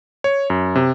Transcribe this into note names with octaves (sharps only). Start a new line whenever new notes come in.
C#5
F#2
C3